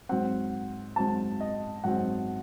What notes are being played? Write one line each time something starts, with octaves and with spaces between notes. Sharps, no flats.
G#2 F#3 C4 F#5
G#2 F#3 C4 A5
D#5
G#2 F#3 C4 F#5